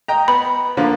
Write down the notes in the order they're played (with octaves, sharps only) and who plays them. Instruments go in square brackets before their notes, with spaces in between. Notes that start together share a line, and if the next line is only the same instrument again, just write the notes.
[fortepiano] D#5 G5 A#5
[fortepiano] B3 [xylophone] B5
[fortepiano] D3 F3 A#3